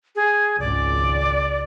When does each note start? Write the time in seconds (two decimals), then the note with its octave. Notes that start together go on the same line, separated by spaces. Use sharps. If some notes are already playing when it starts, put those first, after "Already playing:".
0.16 G#4
0.59 G#1 C#2 D5